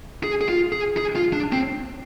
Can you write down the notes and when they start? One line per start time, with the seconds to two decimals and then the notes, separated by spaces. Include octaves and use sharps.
0.24 G#4
0.41 G#4
0.49 F4
0.72 G#4
0.97 G#4
1.16 F4
1.33 D4
1.52 C4